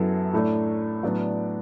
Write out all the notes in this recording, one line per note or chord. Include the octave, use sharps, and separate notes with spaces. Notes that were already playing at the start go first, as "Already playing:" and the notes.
Already playing: F#2 F#3 B3 E4 A4
A2 A3 D4
A2 F#3 B3 D4 D5